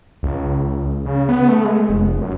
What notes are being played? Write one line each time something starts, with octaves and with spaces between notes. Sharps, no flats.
C#2
C#3
B3
A3
G#3
F1
F#2